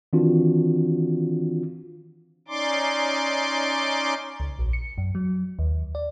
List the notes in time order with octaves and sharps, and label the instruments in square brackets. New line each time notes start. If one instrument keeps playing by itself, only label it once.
[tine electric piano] D#3 E3 C4 D4 F4 F#4
[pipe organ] C#4 D#4 D5 C6 D6
[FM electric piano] C#2
A#1
C#7
F#2
F#3
D#2
D5